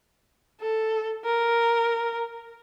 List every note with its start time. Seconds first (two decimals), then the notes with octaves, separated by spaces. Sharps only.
0.61 A4
1.25 A#4